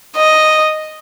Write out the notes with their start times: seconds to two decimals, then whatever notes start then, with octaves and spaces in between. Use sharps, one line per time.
0.16 D#5